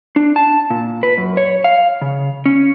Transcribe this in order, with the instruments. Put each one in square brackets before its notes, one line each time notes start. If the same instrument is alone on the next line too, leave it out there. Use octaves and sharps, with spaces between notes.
[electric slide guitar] D4
A5
A#2
B4
F#2
C#5
F5
C#3
C#4